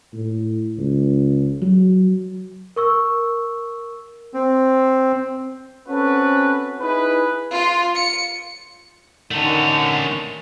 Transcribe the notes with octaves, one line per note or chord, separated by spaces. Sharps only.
A2
C#2
F#3
A#4 C#6 E6
C4
C4 C#4 F#4 A4 B4
D#4 E4 G#4 B4
F4
C#7
D3 D#3 A3 C#4